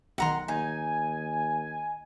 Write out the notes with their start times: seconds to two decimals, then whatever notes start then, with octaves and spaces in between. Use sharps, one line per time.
0.18 B1 D#3 F#5 A#5 C6
0.48 D#2 D#4 G#5